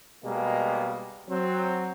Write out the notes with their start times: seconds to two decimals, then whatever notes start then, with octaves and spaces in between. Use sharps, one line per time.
0.24 B2 G3 G#3 A#3
1.29 F#3 C4